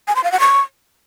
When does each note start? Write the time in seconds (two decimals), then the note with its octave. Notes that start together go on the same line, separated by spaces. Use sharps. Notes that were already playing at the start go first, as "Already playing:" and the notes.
0.08 G#5
0.16 C6
0.24 F5
0.32 F#5
0.40 C#6